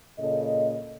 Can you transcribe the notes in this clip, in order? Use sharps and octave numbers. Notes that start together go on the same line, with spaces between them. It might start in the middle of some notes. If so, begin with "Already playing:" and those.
A#2 C#3 A4 D#5